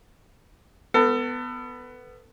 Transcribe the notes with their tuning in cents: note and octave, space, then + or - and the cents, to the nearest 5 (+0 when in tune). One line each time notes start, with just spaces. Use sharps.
B3 +10 A4 +35